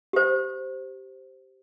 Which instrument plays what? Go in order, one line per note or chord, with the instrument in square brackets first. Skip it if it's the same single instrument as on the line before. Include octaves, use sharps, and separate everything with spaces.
[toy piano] G4 C5